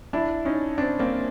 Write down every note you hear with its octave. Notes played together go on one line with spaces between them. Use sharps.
D4 E4
C#4 D#4
C4 D4
A#3 C4